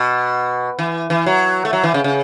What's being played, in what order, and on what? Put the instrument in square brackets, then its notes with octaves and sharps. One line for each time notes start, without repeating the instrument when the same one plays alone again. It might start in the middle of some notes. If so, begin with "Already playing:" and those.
Already playing: [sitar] B2
E3
E3
F#3
A3
F#3
E3
C#3
C#3